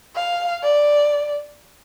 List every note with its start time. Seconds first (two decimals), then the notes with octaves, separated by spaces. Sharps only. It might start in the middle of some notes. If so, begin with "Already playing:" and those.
0.16 F5
0.63 D5